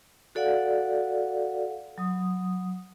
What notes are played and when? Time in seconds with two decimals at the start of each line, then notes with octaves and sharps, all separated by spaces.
0.35 F#4 A4 D5 F5 F#5
1.98 F#3 D#6